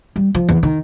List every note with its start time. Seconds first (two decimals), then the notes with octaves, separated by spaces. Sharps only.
0.16 G3
0.35 F3
0.49 E2
0.63 D#3